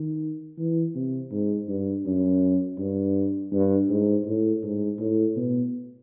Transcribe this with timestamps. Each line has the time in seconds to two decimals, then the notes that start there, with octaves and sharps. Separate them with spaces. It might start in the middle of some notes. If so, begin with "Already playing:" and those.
Already playing: D#3
0.58 E3
0.95 C3
1.31 G#2
1.69 G2
2.06 F#2
2.78 G2
3.53 G2
3.90 G#2
4.27 A2
4.64 G#2
5.00 A2
5.36 B2